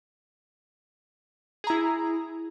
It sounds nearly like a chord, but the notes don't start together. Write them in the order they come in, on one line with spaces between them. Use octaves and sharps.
G#4 A#5 E4